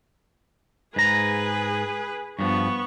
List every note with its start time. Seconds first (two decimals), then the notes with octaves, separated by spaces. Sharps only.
0.96 G#2 G#4 B4 A#5
2.39 G2 F3 B3 C#6